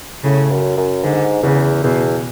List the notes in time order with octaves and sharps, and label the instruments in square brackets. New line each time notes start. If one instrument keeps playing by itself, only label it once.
[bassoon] A2 [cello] C#3
[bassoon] F#2
F#2
[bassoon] G#2 [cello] D3
[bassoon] E2 [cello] C#3
[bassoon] E2 [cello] B2